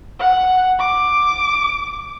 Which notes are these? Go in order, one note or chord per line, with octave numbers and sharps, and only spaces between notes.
F#5
D6